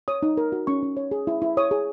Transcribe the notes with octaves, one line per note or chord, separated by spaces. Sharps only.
C#5 D#6
D#4
A#4
F#4
C#4 C#6
C#4
C#5
G#4
E4
E4
C#5 D#6
G#4